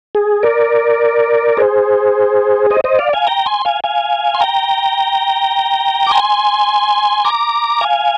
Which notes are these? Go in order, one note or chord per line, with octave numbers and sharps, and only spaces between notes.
G#4
A#4 D5
G#4 C5
C5 D#5
C5 D#5
D5 F5
F5 G#5
G5 A#5
G#5 C6
F5 G#5
F5 G#5
C6
G5 A#5
D6
G#5 C6
A#5 D6
F5 G#5